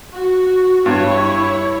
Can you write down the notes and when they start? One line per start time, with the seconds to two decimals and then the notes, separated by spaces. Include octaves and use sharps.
0.13 F#4
0.86 G2 E4 C#5